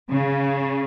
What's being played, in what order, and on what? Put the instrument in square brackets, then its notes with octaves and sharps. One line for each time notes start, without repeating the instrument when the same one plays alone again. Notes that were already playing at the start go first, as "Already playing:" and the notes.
[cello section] C#3